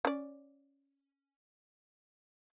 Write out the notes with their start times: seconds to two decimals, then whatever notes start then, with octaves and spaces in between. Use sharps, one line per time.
0.05 C#4 D5